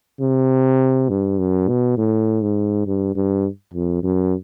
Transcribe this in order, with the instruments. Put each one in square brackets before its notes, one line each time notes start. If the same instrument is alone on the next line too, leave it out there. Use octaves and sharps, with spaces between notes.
[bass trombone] C3
G2
F#2
B2
A2
G#2
G2
G2
F2
F#2